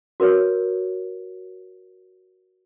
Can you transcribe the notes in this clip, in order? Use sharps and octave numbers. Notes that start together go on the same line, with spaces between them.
F#4 A#4 B4 C#5